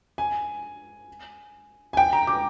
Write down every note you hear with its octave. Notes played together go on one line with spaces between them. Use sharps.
G#5
G#5
G5
A#5
D6